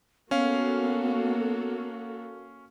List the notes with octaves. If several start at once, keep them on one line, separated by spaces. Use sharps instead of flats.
A#3 B3 C#4 F#4 A4 F5